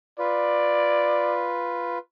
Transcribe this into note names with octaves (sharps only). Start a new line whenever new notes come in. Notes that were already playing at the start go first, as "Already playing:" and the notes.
F4 B4 D5